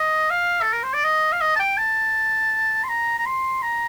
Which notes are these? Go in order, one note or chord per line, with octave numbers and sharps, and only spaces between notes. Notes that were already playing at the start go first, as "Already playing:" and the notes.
Already playing: D#5
F5
A4
A#4
C5
D5
D#5
F5
D#5
A5
G5
A5
C6
A#5
A#5
C6
A#5